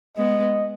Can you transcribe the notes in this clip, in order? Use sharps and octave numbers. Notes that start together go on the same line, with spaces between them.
G#3 B3 D#5